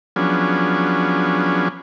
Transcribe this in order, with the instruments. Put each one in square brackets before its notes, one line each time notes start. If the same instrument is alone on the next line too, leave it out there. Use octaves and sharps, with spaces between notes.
[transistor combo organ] F3 F#3 B3 C#4 D4 G#4